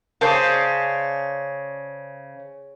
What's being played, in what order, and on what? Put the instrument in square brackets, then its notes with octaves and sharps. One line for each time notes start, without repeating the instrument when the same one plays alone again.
[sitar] C#3 [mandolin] C5 D5 A5